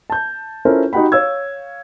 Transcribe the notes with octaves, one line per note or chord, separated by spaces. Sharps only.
A5 G6
C#4 E4 F4 A4 A#4 C5
D#4 F#4 G4 F#5 G5 B5
C#5 F5 E6 G#6